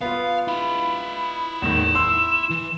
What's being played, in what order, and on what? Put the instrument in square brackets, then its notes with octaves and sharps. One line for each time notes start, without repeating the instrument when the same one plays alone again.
[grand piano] B3 F4 [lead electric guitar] F5
[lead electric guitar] E4 F5 [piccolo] B5
[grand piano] E2 A2 D#3 [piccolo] E7
[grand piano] C6 E6
[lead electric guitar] E3